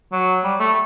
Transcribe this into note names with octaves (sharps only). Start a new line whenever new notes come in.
F#3
G3
A3